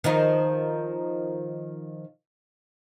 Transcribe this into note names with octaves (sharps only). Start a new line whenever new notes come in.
D#3 F3 D#4